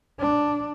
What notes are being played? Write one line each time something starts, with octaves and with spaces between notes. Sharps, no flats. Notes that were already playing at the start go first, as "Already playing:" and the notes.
D4